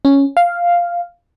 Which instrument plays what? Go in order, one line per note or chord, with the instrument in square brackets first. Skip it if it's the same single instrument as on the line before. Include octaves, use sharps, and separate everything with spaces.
[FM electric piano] C#4
F5